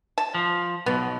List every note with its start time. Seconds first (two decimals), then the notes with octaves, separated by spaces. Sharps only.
0.18 A5
0.35 F3
0.86 B1 B2 B3